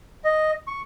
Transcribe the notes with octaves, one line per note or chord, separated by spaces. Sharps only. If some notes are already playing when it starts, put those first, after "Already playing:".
D#5
C#6